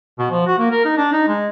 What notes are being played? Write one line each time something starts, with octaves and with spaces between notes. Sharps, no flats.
B2
F3
F#4
A#3
A#4
D#4
D4
D#4
G#3